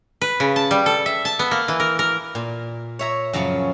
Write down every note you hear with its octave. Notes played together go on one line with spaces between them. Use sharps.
B4
C#3
A5
G3
A4
E5
A5
B3
A#3
E3
A#4
A#4
A#2
C#5 E5 A#5
F#2 C#3 F3 C#4